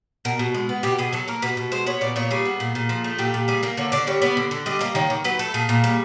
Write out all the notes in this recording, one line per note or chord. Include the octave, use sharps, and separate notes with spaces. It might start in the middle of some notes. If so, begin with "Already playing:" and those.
B2 A#4
B2
G#3
B3
B2 G4
B2 G#4
F#3 A4
A#3 A#4
B2 B4
B2
G#3 C5
B3 C#5
A#2 D5
A#2 C#5
G3 G#4
B3
A#2
A#2
F3
A3
A#2 G4
A#2
G3 G#4
A#3 A#4
D3 C#5
D3 D5
G3 C#5
B3 D5
D3
D3
G3 D#5
A#3 D#5
D#3 C#5
D#3
F#3 B4
A3 A4
A#2 G#4
A#2
G3